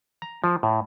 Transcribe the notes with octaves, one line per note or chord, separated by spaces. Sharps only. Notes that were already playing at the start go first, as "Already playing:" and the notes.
A#5
F3
A2